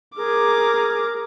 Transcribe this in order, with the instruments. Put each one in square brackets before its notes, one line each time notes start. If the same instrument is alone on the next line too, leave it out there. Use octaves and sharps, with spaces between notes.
[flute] G#4 [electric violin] A#4 D6